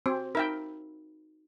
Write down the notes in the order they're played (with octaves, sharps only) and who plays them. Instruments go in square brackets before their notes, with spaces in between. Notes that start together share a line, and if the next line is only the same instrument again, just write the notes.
[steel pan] C4 [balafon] F#4
[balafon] D#4 [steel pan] A#4 E5 G5